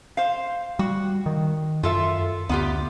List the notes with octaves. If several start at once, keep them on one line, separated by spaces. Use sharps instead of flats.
C5 F5
G3 F#4
D#3
F#2 F4 A4 E5
D2 B3 F4 G4